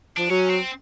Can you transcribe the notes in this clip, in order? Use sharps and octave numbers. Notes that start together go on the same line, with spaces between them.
F3 D4
F#3 C#4
C4